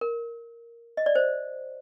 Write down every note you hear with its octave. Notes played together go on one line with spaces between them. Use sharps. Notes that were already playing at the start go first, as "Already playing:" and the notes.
A#4
D#5
D5
C5